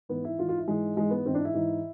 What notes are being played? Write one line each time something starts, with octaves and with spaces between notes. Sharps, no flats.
G#2 E3 B3
E4
G#2 E3 F4
F4
E4
G#2 E3 G#3
G#2 E3 G#3
B3
G#2 E3 C4
D4
E4
G#2 E3